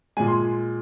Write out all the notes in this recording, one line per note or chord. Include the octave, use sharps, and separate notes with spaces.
A#2 G#3 G#5
C6